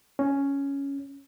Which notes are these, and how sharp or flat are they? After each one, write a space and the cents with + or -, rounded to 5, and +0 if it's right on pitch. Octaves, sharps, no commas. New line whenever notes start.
C#4 +5